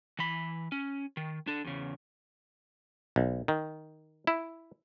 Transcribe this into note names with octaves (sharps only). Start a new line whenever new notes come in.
E3 B5
C#4
D#3
D4 A4
E2 C#3
B1
D#3
E4